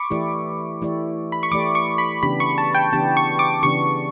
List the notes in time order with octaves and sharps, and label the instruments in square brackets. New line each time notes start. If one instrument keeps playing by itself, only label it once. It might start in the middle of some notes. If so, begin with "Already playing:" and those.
Already playing: [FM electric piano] B5 C#6 D6
[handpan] E3 A3 E4 G4 D5
E3 A3 E4 G4 D5
[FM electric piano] B5
C#6
[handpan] E3 A3 E4 G4 D5 [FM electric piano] D6
[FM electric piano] C#6
B5
[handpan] C#3 E3 B3 D4 G4 [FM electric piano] B5
[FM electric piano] C#6
A5
G5
[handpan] C#3 E3 B3 D4 G4 [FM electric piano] A5
[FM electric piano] C#6
D6
[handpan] C#3 E3 B3 D4 G4 [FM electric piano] C#6